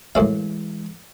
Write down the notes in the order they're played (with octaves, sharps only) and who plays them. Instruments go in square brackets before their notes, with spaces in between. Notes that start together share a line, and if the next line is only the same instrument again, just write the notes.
[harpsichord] F#2 A2 F5 [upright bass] E3 G#3